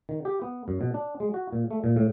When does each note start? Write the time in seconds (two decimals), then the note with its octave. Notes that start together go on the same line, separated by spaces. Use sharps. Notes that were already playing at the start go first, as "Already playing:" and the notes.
0.09 D#3
0.25 G4
0.42 B3
0.68 F#2
0.81 B2
0.94 D4
1.20 G#3
1.34 F#4
1.53 A#2
1.71 A3
1.84 A#2
1.96 A2